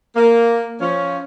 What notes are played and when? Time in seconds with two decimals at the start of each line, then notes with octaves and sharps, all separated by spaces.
0.16 A#3
0.81 F3 C#4